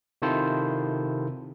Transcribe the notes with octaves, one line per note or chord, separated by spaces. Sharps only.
C3 D#3 E4 F4 A4 C5